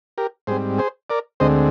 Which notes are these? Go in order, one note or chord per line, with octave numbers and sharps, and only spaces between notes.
G4 A#4
G#2 G3 C4 G#4 C5
G#4 C5
A#4 D5
D2 D3 G#3 C4 C5 D#5